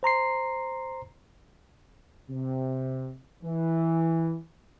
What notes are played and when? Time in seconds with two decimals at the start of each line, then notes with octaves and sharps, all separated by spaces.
0.03 C5 A#5 C6 C7
2.29 C3
3.43 E3